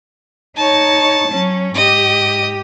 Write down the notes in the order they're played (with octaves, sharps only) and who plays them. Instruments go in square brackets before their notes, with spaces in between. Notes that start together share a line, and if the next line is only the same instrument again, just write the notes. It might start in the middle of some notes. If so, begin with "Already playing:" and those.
[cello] D#4 C#5 [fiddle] A5
[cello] F#3 C#4
[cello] G#2 G4 [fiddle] D#5